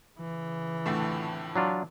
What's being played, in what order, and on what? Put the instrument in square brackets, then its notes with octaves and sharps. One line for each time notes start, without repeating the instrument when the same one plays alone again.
[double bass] C#3 E3
[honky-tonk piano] F2 A2 D3 [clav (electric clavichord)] A3
[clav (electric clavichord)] F#3 D4 F4